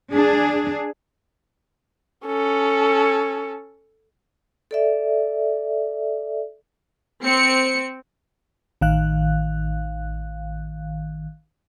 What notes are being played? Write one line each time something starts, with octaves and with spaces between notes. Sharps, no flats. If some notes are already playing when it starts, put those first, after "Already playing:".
D4 G#4
C#4 A4
A4 D5 E5
C4 C#7
A1 D#3 F5 F#6